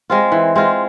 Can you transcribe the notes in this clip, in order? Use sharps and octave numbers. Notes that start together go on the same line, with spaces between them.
G#3 C4 F4
E3
G#3 C4 F4